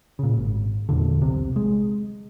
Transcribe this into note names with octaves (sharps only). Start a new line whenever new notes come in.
A#2 C#3
G#1
E1 E2 A#2 D3
B1 C3
G#3